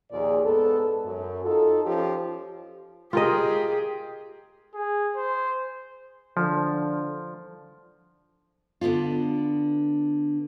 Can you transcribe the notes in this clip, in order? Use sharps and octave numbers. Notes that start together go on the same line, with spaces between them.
D#2 A#2 F3 G#4 D5
G#2 B3 A4
F#2
D#4 F4 A4
F3 C#4 F4 G4
F4 G4 G#4 A#4 D#5
G#4
C5
D3 F3
D3 B3 D4 F4